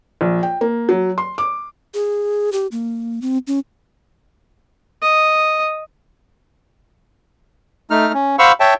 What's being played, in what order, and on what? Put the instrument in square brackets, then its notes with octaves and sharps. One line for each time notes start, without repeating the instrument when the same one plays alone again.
[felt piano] A#1
G5
A#3
F#3
C6
D6
[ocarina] G#4
G4
A#3
C4
C#4
[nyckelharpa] D#5
[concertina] A3 D#4 F6
C#4
C5 F5 F#5 B5 C#6 E6
C#5 E5 G5 A5